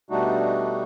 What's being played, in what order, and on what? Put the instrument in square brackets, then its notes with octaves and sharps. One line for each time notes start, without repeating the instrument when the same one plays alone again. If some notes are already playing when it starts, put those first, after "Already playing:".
[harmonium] B2 G3 A3 D4 D#4 F#4